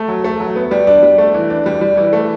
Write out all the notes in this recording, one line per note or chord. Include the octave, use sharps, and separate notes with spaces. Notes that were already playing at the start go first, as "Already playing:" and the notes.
Already playing: A3
F#3
A3
F#3
B3
G3
D4
G3
A3
E3
D4
G3
G3
E3
A3